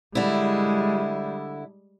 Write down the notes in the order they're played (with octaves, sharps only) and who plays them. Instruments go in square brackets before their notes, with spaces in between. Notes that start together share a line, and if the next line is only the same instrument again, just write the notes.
[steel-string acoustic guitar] D3 E4 [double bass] G3 G#3